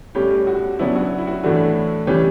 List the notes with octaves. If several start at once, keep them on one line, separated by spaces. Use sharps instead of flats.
A2 G3 C#4 G4
F#4
C#3 F#3 B3 D4 E4
F#4
E4
F#4
A2 E3 A3 D4 F#4
C#3 E3 G3 C#4 G4